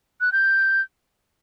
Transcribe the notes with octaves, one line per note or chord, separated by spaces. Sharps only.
F#6
G6